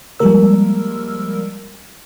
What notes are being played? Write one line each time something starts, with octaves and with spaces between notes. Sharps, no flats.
F3 G3 G#3 A#3 A#4 E6